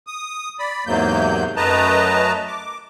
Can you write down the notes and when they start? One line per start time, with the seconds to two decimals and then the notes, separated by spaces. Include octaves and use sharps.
0.07 D#6
0.59 D5 B5
0.87 E2 G#2 C3 F#3 A#3 G6
1.57 F#2 A3 B4 D#5 A5 A#5
2.48 D6